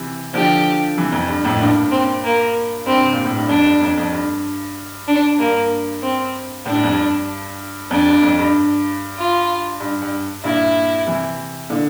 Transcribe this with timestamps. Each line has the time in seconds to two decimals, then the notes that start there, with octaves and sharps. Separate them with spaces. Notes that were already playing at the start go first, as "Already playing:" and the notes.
Already playing: C3 E3
0.34 D3 F3 G4
0.97 C3 E3
1.12 F2
1.28 G2
1.44 F2 A2
1.60 G2 A#2 D4
1.91 C4
2.24 A#3
2.86 G2 C4
3.00 C3
3.13 A#2
3.25 A2
3.36 G2
3.49 F2 D4
3.65 G2
3.81 F2
3.98 F2
4.12 G2
5.08 D4
5.39 G2 A#3
6.02 C4
6.66 A2 D4
6.74 G2
6.83 F2
6.92 G2
7.91 F2 D4
8.08 G2
8.22 F2
8.39 G2
9.18 F4
9.80 G2
10.02 G2
10.43 G2 A#2 E4
11.06 C3 E3
11.70 A#2 D3